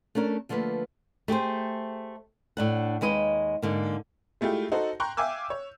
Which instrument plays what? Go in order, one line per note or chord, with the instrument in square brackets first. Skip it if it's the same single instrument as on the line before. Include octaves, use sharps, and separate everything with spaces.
[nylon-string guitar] A3 C#4 D4 A#4
D3 F3 A3 A#3 B4
A3 G4 G#4 C5
A2 D4 F#5
D#2 G#3 B4 D#5
G#2 D3 A#3
[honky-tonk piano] G#3 A3 E4 F4 G4
D#4 F#4 A4 C5
G5 A#5 C6 C#6 F#6 G6
E5 F5 G5 G#5 D6 E6
C#5